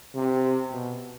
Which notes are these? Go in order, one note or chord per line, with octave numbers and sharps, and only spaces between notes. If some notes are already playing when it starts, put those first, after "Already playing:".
C3
B2